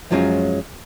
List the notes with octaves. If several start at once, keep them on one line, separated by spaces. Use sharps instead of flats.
F#2 F3 F#3 G#3 C#4 F4